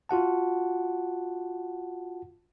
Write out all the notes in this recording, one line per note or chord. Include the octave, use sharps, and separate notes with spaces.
F4 F#4 F#5 A5